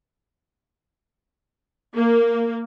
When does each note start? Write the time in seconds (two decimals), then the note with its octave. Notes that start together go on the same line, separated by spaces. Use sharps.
1.96 A#3